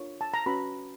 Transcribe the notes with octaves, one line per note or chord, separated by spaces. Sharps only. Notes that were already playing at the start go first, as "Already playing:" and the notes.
Already playing: D4 F4 A#4 C#5
A5
A#5
C#4 F#4 B4 B5